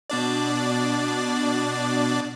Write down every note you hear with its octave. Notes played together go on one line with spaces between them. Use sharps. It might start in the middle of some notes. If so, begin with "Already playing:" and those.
B2 D4 D5